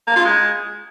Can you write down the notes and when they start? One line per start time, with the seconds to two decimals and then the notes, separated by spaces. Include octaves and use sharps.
0.07 A#3
0.16 F4
0.25 G#3